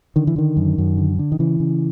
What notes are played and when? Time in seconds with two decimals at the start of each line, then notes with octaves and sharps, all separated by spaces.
0.16 D3 D#3
0.27 E3
0.36 D3 D#3
0.57 F#2
0.78 F#2
0.98 D3
1.19 D3
1.32 D#3
1.39 C#3 E3
1.60 C#3